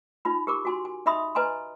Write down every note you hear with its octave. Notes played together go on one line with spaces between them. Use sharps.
D#4 F4 B5
G4 A#4 D6
F#4 G#5 C6
G#5
D#4 D#5 E5 B5 C6 D#6
B4 D#5 G#5 A#5 C6